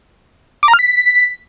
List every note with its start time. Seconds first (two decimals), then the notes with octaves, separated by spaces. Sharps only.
0.63 D6
0.68 A#5
0.74 F6
0.79 B6